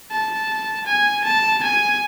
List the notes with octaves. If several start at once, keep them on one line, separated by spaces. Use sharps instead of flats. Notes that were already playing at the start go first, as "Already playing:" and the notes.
A5
G#5
A5
G#5